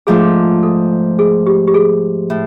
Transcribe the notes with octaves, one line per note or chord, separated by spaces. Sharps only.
G#2 F3 A3 D4 F4 G#4
A4
G#4
G4
G4
G#4
A2